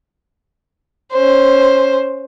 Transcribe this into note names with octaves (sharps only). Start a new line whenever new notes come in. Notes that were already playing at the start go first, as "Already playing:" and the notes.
C#4 C5